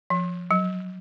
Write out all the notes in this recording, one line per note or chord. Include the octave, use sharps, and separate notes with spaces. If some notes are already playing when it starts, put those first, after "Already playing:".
F3
F#3